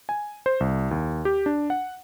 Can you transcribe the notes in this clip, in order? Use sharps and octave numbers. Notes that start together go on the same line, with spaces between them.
G#5
C5
C2
D#2
G4
D4
F#5